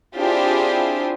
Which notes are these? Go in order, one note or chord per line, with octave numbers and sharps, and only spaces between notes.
C4 D4 E4 F4 G4 G#4